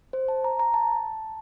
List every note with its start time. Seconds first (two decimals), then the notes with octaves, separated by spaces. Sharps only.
0.13 C5
0.28 A5
0.44 A#5
0.59 A#5
0.74 A5